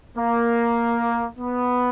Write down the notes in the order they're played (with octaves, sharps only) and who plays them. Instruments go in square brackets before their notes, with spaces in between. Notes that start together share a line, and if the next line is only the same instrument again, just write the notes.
[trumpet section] A#3
B3